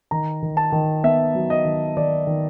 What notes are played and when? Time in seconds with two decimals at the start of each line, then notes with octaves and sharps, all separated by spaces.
0.11 D#3 A#5
0.42 D#3
0.57 A5
0.72 D#3
1.04 B3 E5
1.35 F#3
1.50 D#5
1.65 D#3
1.97 D#3 D5
2.27 D#3